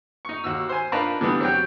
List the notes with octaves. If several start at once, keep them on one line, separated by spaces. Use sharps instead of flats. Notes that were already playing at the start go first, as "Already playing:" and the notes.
D#4 C#6
D#2 F#4 E6
C5 G#5
D4 D#4 F4 A#4 B4 A5
D3 E3 G3 B3 D#6
F#3 C4 F#4 G4 G5